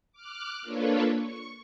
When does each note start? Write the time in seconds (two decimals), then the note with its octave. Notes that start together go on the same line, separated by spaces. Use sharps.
0.12 D6 F6 F#6
0.62 A#3 D4 F4 A4 B4 C#5
1.18 C#6